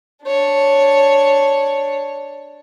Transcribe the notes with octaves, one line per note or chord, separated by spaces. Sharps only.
D4 C#5